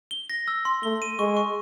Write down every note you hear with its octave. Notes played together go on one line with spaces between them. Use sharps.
G7
A#6
E6
C6
A3 G7
D#7
G#3 C#6
C#6